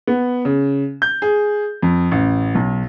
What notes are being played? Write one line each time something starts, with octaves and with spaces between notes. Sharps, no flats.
B3
C#3
G6
G#4
F2
A1
B1